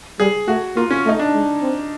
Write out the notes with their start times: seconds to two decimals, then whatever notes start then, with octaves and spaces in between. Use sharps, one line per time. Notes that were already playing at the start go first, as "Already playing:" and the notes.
0.20 G3 G#4
0.48 A3 F#4
0.76 A#3 F4
0.91 C#4
1.05 A3 D#4
1.19 D4
1.34 G#3
1.62 C4